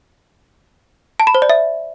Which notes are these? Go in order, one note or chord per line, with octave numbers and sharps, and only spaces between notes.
A5
B5
C5
D5
E5